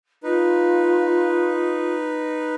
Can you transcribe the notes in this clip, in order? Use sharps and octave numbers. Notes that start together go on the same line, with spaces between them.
D#4 F4 B4